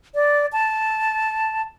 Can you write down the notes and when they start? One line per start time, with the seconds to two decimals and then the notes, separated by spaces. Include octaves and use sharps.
0.15 D5
0.53 A5